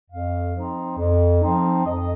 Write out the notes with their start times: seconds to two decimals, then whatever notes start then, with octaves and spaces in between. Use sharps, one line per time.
0.11 F2 F5
0.54 F3 C4 D#4
0.98 F2
1.41 F3 C4 D#4
1.85 F2 D#5